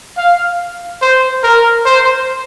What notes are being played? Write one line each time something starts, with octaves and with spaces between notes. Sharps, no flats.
F5
C5
A#4
C5